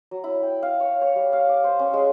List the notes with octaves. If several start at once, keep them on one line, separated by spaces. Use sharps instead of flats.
F#3
E4
G5
F5
C#5
C#5
G3
F5
D6
C5
C#4
G#3